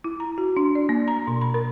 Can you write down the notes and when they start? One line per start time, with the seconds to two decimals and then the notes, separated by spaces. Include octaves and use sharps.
0.04 E4
0.20 A#5
0.38 F#4
0.57 D4
0.75 D5
0.89 A#3
1.08 A#5
1.27 B2
1.41 B5
1.54 A#4